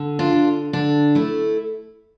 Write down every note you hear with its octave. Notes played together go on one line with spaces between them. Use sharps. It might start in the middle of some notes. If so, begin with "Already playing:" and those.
Already playing: D3
D4 F4
D3
D3 D4
A3 E4